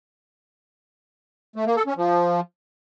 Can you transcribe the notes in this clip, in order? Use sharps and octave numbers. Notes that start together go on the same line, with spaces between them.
A3
A#3
A4
C#4
F3